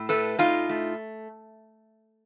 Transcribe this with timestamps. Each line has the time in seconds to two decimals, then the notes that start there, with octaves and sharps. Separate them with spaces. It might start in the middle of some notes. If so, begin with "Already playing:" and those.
Already playing: A2
0.09 A3 A4 B4
0.38 A2 D#4 F4
0.69 A3